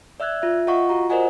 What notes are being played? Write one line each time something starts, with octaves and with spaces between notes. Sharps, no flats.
D5 E5 E6 F#6 G#6
F4 E5
F4 D#5 F5 F#5 C#6
F4 F#4 A#5
A#4 C5 D5 D#5 F#5 G#5